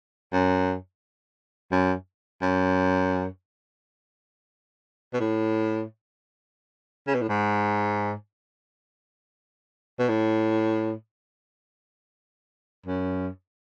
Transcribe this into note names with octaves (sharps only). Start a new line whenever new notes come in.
F#2
F#2
F#2
B2
A2
C#3
B2
A2
G#2
B2
A2
F#2